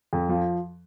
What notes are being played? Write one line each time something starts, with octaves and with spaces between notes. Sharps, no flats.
F2
F3